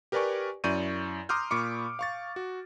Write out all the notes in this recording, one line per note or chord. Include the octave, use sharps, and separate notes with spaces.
G4 A#4 B4 D5 G#5 C#6
F#2 E4 D5 C#6 G6 D#7
A#5 C6 D6 D#6 F6 G6
A#2 B5 C#6 D6 C#7
F5 C#6 A6
F#4